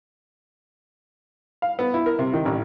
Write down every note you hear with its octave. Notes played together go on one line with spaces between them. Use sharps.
F5
B3
E4
A#4
C3
D#3
A1